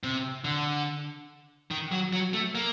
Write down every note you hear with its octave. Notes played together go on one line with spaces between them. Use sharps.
C3
D3
D#3
F#3
F#3
A3
A#3